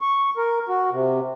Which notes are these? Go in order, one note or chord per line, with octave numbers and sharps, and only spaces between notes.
C#6
A#4
F#4
C3